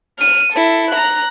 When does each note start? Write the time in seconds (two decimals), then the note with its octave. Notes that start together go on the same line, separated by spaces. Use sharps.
0.19 F6 D#7
0.52 E4 A4
0.91 A#5 F#6